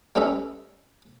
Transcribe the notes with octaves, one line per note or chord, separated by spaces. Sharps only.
G3 A3 B3 C#4 D#4 E5